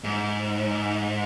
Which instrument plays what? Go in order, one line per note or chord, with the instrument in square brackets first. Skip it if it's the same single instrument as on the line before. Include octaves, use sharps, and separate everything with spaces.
[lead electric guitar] G#2